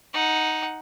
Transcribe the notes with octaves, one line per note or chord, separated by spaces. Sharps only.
D#4 F#5